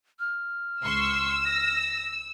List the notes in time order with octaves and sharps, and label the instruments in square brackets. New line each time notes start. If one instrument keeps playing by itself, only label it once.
[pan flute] F6
[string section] C#2 C6 C#6 [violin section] E6
[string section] A#6